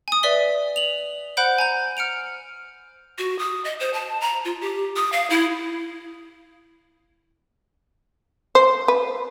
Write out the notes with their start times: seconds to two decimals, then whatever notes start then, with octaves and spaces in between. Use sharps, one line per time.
0.08 G#5 D#6
0.23 B4 D5 E5 B6 G7
0.76 F7 F#7
1.37 C5 F#5 B5 F#6 G6 D7
1.58 G#5 A#5 G6
1.97 F6 C#7 D7 F7
3.18 F#4
3.39 D#6
3.65 D#5
3.80 C5
3.93 A5
4.21 A#5
4.45 F4
4.61 G4
4.96 D#6
5.13 F5
5.30 E4
8.55 C5
8.88 B4